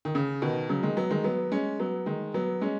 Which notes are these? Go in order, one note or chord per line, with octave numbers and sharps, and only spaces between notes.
D#3
C#3
B2 D#3
C#3 F#3
D#3 G#3
F#3 B3
D#3 G#3
F#3 B3
G#3 C#4
F#3 B3
D#3 G#3
F#3 B3
G#3 C#4